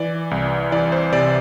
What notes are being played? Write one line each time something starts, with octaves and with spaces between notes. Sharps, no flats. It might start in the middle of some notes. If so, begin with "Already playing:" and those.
Already playing: E3 D5
C2
E3 D5
C5
C3 D5